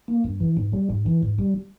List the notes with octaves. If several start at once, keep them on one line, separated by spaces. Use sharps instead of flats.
A#3
G2
E3
G#2
G3
G#2
E3
G#2
G3